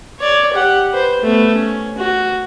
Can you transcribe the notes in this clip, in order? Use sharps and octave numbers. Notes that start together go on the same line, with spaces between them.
C#5 D5
G4 F#5
B4 C5
A3 B3
C#4
F#4